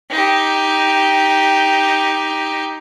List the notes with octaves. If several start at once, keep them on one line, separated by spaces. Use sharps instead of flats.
D#4 G4